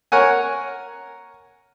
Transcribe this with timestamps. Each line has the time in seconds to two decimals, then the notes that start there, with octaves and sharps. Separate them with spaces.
0.12 A#4 C#5 F#5 G#5